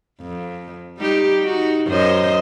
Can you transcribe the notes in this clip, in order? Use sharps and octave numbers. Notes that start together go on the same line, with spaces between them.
F2
G3 D#4 G4
D#4 F#4
F#2 C5 D#5